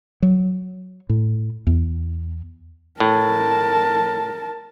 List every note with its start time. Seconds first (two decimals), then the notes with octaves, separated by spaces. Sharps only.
0.22 F#3
1.09 A2
1.67 E2
3.00 A2 A#4 A5